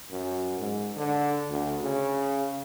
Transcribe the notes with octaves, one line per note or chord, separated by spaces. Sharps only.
F#2
G#2
D3
D2
C#3